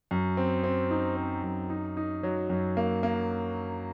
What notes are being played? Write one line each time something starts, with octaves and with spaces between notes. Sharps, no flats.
F#2
C4
C4
D#4
C4
F#2
D#4
D#4
F#3
F#2
A#3
A#3